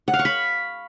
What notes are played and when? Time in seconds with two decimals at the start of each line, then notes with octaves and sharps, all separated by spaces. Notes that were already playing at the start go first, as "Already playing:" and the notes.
0.08 F#5
0.13 F5
0.19 C#6
0.25 B5